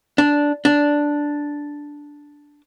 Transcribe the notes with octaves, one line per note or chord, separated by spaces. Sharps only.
D4
D4